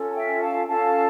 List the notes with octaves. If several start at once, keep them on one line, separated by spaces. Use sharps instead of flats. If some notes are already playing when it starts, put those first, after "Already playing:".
Already playing: C#4 F4 A4
A5
E5 G5
F5 A5
C#4 F4 A4 F5 A5